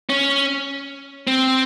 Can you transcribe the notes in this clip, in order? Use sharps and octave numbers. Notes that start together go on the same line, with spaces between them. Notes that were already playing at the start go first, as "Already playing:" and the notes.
C#4
C4